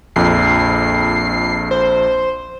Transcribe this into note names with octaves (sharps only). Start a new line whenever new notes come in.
A#1 F2 C7
C5